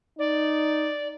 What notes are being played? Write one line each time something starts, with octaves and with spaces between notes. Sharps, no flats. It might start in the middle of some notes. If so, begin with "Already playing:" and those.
D#4 D5